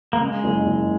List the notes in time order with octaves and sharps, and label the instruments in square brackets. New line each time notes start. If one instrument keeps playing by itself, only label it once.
[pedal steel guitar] A#3
[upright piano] C#3 [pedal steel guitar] G#3
[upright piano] F#1
F#1